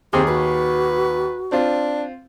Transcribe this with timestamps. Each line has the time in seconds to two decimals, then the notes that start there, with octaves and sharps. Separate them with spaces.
0.13 D#2 C4 G4 G#4 D#6
0.28 F#4 B4
1.52 C4 D4 F4